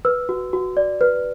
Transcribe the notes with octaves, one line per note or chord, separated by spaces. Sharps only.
B4 E6
F#4
F#4
D5
B4